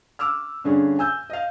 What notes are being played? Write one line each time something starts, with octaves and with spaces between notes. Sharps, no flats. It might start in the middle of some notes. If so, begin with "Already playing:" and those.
D6 E6 F6
G2 D3 C#4 G#4
G#5 E6 G6
D#5 F5